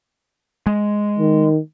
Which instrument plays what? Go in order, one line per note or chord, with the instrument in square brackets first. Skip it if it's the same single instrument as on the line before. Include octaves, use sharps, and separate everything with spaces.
[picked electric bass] G#3
[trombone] D#3